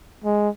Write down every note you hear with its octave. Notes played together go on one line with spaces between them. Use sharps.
G#3